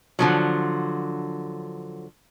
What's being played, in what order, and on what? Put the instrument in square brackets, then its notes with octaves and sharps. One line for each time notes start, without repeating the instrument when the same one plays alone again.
[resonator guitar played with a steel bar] D3 F3 F#3